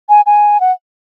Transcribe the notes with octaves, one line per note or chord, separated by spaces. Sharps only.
G#5
G#5
F#5